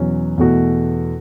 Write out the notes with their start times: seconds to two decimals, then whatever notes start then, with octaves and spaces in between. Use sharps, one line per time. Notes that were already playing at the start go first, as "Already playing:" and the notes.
Already playing: E2 B2 F#3 C#4
0.38 E2 B2 A3 F#4